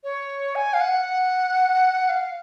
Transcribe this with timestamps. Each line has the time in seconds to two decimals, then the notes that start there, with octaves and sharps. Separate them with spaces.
0.04 C#5
0.55 G#5
0.74 F5
0.81 F#5
2.09 F5